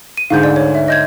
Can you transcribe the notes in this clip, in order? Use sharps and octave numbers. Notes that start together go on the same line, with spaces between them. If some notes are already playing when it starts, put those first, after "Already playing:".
D#7
D2 G#2 D3 F5 G6
D5
C#5
E5
D#5 G6 G#6